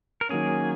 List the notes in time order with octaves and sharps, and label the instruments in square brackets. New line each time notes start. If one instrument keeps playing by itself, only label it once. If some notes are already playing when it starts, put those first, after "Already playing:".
[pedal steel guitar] A#4
[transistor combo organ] D#3 F#3 A#3 C#4 [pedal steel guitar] G#4